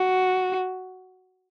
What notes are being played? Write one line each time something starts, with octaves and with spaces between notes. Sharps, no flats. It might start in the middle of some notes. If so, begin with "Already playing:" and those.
Already playing: F#4